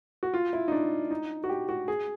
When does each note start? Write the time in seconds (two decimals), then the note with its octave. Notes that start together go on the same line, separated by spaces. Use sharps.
0.23 F#4
0.34 F4
0.53 E4
0.68 D#4
0.72 D4
1.11 D#4
1.44 F#4
1.49 G4
1.69 F#4
1.88 G#4